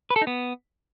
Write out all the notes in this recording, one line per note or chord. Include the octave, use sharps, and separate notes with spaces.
B4
A4
D#4
B3